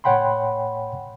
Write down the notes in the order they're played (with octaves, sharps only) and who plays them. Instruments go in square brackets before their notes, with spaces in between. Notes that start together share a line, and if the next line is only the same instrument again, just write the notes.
[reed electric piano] A2 C#5 F#5 G5 B5 C6